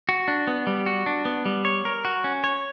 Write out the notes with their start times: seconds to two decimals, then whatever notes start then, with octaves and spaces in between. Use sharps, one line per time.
0.09 F#4
0.28 D4
0.47 B3
0.67 G3
0.86 F#4
1.06 D4
1.25 B3
1.45 G3
1.65 C#5
1.85 A#4
2.05 F#4
2.24 C#4
2.44 C#5